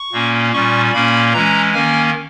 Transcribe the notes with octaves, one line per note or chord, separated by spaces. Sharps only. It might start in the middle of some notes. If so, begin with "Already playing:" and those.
Already playing: C#6
A#2 A#3 C#4
A#2 G3 C#4 C#6
A#2 A#3 C#4 B5
E3 G#3 C#4 A#5
D#3 A#3 C#4 G#5